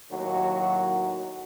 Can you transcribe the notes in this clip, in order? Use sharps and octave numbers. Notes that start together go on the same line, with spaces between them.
D#2 A2 F#3 F#4